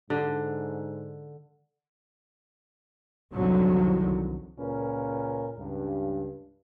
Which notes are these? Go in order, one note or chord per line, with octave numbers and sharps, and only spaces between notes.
G#2 D3
C2 F2 D3 D#3 F#3
C#2 A#2 C#4 A#4 B4
C#2 G2